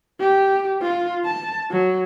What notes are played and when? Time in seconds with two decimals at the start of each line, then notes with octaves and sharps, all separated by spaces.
0.21 G4
0.82 F4
1.25 A5
1.71 F#3